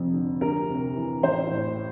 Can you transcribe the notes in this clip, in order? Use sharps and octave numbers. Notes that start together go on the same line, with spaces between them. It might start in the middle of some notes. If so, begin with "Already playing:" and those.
Already playing: F1 F2
D3
D2 A#4
C3
E3
A1 C5
A2